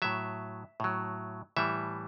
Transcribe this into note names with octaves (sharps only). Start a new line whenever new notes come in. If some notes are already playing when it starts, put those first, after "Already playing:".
A2 F#3 E5
A2 F#3
A2 E3 G3 E5